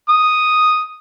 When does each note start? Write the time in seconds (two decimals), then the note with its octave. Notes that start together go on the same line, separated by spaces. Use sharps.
0.09 D#6